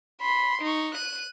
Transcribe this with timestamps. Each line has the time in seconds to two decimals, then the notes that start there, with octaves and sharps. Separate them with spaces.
0.21 B5 C6
0.62 D#4 C#6
0.95 F#6 D#7